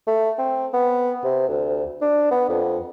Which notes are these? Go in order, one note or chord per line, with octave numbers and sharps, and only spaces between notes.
A3
C4
B3
C3
D2
D4
B3
F2